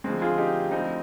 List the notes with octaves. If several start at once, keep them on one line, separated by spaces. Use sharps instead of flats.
D2 D3 F3 G#3 C4
F4 G#4
D#4 G4
D2 D3 F3 C4 D#4